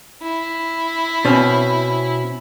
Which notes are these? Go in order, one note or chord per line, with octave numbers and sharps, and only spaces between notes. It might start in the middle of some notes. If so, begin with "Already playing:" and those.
E4
B2 C4 C#4